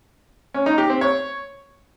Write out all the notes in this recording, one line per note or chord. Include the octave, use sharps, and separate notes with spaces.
C#4
D#4
G4
C4
C#5